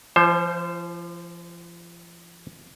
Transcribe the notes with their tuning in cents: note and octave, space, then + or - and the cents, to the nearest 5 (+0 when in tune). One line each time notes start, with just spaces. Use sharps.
F3 -35 C5 +15